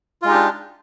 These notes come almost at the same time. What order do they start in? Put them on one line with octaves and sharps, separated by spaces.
F4 G#3 D#4 G4 D4